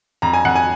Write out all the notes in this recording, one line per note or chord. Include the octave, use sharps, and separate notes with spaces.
F2 A#5
G#5
F2 F#5
G#5